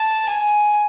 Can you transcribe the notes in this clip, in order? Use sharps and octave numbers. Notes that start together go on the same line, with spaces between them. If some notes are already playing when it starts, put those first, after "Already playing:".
Already playing: A5
G#5